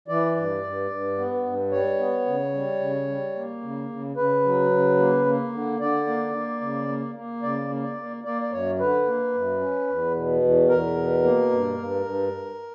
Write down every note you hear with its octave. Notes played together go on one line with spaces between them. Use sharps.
E3 D5
G2
G2
G2
B3
G2
G3 C#5
B3
C#3
G3
C#3
G3
A#3
C#3
C#3
C#3 B4
F#3
C#3
A#3
A#3
D3
D3 D5
A#3
A#3
C#3
A#3
A#3
C#3 D5
A#3
D5
A#3
A#3 D5
D5
F#2 C#5
D3 B4
A#3
F#2
C#4
E2
B2
E2
E2 A#4
B2
A#3
G2
G2
G2